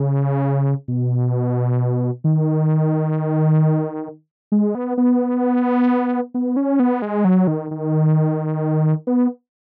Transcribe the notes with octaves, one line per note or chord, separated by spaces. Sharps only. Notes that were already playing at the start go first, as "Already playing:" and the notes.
Already playing: C#3
B2
D#3
G#3
B3
B3
B3
C#4
B3
G#3
F#3
D#3
D#3
B3